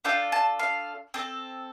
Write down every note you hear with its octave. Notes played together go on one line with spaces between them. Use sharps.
D4 F4 A4 G5
A5
F5
C4 A4